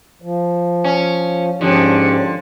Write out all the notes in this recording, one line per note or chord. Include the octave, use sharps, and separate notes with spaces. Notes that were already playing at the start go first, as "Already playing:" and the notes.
F3
C#4
G#2 D3 F3 C#4 G4